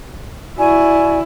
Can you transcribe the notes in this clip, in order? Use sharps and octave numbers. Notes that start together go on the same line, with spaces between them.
E4 F#4 D5 G#5